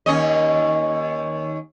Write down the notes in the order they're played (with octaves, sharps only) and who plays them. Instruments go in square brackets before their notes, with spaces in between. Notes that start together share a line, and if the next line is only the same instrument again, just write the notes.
[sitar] D#2 C#4 D#5